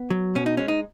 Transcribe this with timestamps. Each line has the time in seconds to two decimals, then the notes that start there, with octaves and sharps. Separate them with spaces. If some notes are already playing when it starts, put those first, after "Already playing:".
Already playing: B3
0.10 F#3
0.35 B2 C#4
0.46 D#4
0.57 G#3 C#4
0.68 D#4